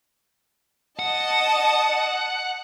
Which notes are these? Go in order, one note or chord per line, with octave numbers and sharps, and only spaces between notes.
D#5 F#5 A5 D#6